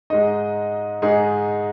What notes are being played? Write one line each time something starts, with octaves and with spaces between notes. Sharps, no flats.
G#2 G#3 D#4 D#5
G#2 G#3 D#4 G#4